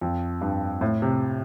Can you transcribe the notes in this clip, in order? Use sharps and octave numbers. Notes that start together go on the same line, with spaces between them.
F2
G2
A2
C3